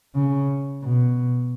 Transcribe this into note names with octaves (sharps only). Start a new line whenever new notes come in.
C#3
B2